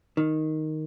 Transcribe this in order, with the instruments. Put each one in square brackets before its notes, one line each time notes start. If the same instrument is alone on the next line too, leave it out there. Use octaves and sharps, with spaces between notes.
[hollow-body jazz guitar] D#3